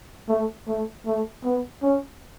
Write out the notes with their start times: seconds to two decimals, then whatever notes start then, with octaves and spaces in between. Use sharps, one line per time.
0.29 A3
0.68 A3
1.06 A3
1.44 B3
1.82 C#4